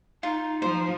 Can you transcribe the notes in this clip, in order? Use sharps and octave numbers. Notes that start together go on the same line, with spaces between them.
D#4 F4
F3 C5